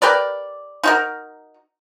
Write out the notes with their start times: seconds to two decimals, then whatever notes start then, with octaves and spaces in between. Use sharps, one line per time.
0.02 G4 A#4 B4 D5
0.83 D#4 F#4 A#4